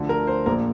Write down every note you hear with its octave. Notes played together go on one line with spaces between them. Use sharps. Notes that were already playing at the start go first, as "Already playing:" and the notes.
Already playing: D2 D3 F3
A#4
C5
A#1 A#2 A#3 A#4